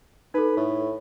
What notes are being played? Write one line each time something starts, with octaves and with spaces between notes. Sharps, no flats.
D#4 A4 B4
A2